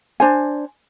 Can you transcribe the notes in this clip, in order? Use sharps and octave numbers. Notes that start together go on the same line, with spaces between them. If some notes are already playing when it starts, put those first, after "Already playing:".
D4 C5 G#5